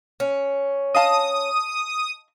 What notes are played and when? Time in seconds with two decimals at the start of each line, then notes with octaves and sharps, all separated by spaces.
0.20 C#4
0.95 D#5 F5 A5 D#6